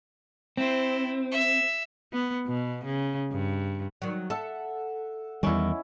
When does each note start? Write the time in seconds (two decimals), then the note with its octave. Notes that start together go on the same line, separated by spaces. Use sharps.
0.57 C4 E4 C5
1.32 E5
2.13 B3
2.46 B2
2.85 C#3
3.31 G2
4.02 D#3 F#3
4.30 A4 E5 F#5
5.43 E2 D#3 G3 C#4 D#4 E4